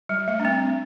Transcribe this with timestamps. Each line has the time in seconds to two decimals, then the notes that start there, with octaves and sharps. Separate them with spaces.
0.09 G3
0.28 A3
0.40 D4
0.45 C4